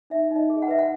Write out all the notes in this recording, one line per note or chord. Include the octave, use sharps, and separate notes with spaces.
D#4 E5
D#4
D#5
G#4
F#5
B4 E5
F#5